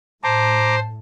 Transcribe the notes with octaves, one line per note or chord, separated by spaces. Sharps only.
A2 C5 A5 A#5 D6